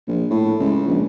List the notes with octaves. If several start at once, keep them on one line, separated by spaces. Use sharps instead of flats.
A#1
A2
C#2
A#1